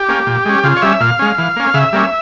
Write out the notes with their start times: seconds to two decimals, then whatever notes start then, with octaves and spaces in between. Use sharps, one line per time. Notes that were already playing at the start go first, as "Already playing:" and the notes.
Already playing: G4
0.09 A#3 C#4
0.27 A#2
0.45 G#3 C#4
0.64 C#3 F4
0.77 C#5
0.82 G3 C#4 E5
1.01 A#2 F5
1.19 G#3 C#4
1.38 E3
1.56 A#3 C#4
1.74 C#3 E5
1.93 G3 A#3 C#4